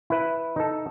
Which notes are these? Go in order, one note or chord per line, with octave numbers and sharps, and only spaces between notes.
E4 B4
D#4 A4